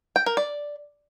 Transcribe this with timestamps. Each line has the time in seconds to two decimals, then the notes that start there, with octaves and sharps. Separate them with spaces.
0.16 G5
0.26 A#4
0.37 D5